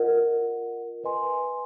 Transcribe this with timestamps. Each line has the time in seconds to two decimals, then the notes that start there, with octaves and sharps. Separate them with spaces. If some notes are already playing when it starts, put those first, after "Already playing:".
Already playing: F4 A#4 D#5 F#5
1.04 B4 D#5 G#5 C6